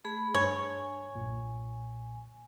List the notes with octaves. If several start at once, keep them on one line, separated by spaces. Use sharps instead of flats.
A3 G#4 B5
G2 C#5 G#5
B1 A#2